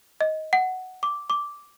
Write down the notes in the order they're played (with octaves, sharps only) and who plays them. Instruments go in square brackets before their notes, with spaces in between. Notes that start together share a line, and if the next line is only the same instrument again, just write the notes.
[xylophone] D#5
F#5
D6
D6